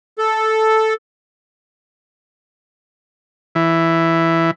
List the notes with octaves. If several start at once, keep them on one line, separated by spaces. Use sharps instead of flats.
A4
E3